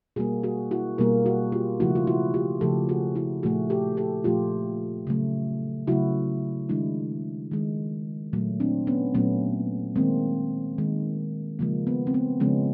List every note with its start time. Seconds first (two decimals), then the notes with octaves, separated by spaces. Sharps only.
0.16 B2 G3 A#3 F#4 G#4
0.43 F#4 G#4
0.71 E4 F#4
0.98 B2 G3 A#3 G#4 A#4
1.26 F#4 G#4
1.52 F4 G4
1.80 C#3 F3 A3 E4 F#4
1.95 F4
2.07 E4 F#4
2.34 F4 G4
2.61 C#3 F3 A3 G4 A4
2.89 F#4 G#4
3.15 E4 F#4
3.43 A#2 F3 A3 F#4 G#4
3.70 G4 A4
3.97 G4 A4
4.24 A#2 F3 A3 F4 G4
5.07 C#3 F#3 A3
5.87 C#3 F#3 A3 E4 F#4
6.69 D#3 G#3 D4 E4
7.51 D#3 G#3
8.33 A#2 F#3 A3
8.60 C4 D4
8.87 B3 C#4
9.14 A#2 F#3 A3 B3 C#4
9.96 D#3 G#3 A#3 C4
10.78 D#3 G#3
11.59 C#3 F3 G#3 A#3
11.87 B3
12.07 C4
12.14 B3
12.40 C#3 F3 G#3 B3 C#4